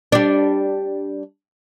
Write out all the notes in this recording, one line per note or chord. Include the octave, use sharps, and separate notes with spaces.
G3 D4